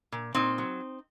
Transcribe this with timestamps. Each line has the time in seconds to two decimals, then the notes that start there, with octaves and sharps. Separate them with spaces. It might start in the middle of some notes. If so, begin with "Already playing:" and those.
0.12 A#2
0.34 A#2 C4 D#4
0.58 F#3